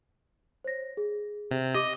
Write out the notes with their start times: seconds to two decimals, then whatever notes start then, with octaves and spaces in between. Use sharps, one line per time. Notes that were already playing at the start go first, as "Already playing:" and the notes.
0.64 C5 C#5 A#6
0.97 G#4
1.51 C3
1.75 G4 D#5 D6 D#7